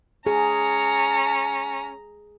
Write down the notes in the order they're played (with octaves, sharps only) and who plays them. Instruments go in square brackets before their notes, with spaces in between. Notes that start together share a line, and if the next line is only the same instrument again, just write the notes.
[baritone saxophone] C#4 [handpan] G#4 [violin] A#5